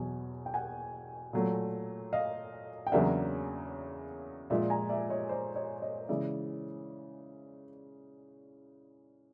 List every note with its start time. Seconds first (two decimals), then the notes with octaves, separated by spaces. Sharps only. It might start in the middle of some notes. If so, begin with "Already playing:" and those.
Already playing: E2 B2 F#3 G#5
0.46 G5
0.54 F#5 G#5
1.33 A#2 F#3 A3
2.13 D#5 F5
2.87 G5
2.92 E2 C#3 F#3 A#3 D4 E5 F#5
4.50 A#2 F3 G#3 D5 E5
4.70 G#5 A#5
4.89 D5 E5
5.10 C#5 D#5
5.29 C5 D5
5.55 C#5 D#5
5.82 C#5 D#5
6.09 C#3 E3 G#3 D5 E5